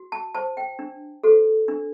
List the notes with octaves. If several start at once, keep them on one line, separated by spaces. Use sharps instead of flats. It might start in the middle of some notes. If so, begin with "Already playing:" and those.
Already playing: F#4
A5
C5 A5
G5
D4
F#4 A4 C5
D4